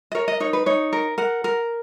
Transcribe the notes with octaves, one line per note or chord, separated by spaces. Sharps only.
D#5
A#4 C#5
D#5
D#4 C#5
B4
D#4 C#5
A#4
A#4 F#5
A#4